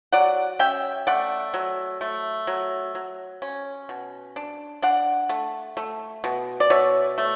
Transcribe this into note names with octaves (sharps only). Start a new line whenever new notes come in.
F#3 D5 F#5
C#4 E5 G5
A3 D5 F#5
F#3
A3
F#3
F#3
C#4
B2
D4
D4 D5 F#5
A3
A3
B2
D5
B2 C#5 E5
A3